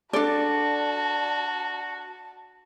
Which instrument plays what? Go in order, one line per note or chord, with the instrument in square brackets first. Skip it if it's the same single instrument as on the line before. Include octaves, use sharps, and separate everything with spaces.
[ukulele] D4 A4 D5 [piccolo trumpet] F#4 [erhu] A5